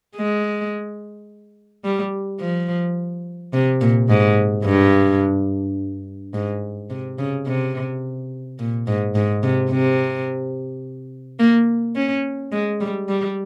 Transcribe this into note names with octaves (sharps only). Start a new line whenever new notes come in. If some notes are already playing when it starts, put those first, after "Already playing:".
G#3
G3
F3
C3
A#2
G#2
G2
G#2
C3
C#3
C3
A#2
G#2
G#2
C3
C3
A#3
C#4
G#3
G3
G3